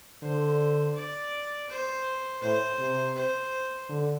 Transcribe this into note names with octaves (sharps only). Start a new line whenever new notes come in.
D3 C5
D5
C5
A2 C5
C3
C5
D3